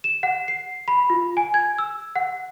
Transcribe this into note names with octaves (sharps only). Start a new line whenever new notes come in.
E7
F#5
C7
B5
F4
G#5
G#6
E6
F#5